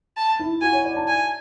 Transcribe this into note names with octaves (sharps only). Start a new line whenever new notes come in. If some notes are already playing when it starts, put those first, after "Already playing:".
A5
E4
F#4 G#5
C#5
D5
A5
G#5